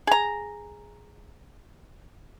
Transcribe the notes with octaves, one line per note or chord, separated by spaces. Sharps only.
G#4 A#5